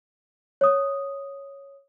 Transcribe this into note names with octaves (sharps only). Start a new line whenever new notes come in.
C#5 D#6